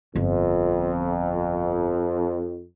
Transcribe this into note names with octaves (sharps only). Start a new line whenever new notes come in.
G1 F2